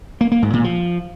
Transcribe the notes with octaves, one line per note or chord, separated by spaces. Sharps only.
A#3
A#3
G#2
A#2
F3